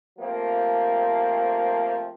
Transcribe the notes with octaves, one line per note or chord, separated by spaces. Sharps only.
F3 A3 A#3 C4 G4 A#4